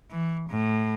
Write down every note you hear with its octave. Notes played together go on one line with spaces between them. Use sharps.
E3
A2